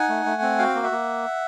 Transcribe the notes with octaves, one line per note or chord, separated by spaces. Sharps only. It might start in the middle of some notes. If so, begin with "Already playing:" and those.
Already playing: D#4 F#5 G#5
A3
A3
C4
F#4 F5 G5
A#3
E5 F#5
A#3